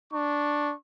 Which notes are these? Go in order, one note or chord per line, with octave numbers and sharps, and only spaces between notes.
D4 C#6